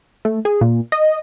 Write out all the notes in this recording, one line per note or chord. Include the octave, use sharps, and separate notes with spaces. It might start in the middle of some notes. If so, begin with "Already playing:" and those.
A3
G#4
A#2
D#5